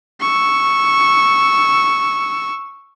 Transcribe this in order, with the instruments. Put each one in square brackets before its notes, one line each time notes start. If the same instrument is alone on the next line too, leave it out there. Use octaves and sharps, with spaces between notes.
[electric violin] C#6 E6